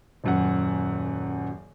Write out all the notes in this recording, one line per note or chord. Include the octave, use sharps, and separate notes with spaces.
D#1 F#2 F#5